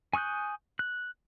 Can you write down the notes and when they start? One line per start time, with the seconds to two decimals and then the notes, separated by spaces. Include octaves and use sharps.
0.14 G#5 C#6 D#6 F#6 G6
0.79 F#6